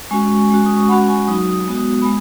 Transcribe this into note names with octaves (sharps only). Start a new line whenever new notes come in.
G#3 C#4 F#4 G#5 C#6
G#3 C#4 F#4
D#6
C#6
G#3 C#4 F#4 F#5 B5
G#5 C#6
F#3 D#4 F#4 D#6
D#6
G#3 B3 F#4
D#6
G#3 B5 D#6